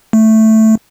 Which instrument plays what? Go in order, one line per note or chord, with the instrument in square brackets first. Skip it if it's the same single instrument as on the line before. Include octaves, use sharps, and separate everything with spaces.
[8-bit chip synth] A3